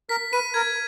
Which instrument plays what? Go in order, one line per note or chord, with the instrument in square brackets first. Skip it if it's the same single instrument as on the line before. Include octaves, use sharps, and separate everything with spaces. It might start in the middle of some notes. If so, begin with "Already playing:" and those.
[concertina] A#4 [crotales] B6
[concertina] B4 [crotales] D#7
[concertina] A#4 [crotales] G#6